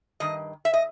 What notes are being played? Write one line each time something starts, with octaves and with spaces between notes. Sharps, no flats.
G2 D#3 D#5
E5
D#5